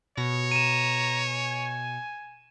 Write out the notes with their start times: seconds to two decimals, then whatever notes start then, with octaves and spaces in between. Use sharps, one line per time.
0.17 B2 C#5 A#6
0.51 A#5 D#7 E7
1.29 G#5